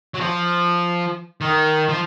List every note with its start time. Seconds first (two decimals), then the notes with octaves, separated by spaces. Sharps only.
0.14 F#3
0.21 F3
1.41 D#3
1.89 F3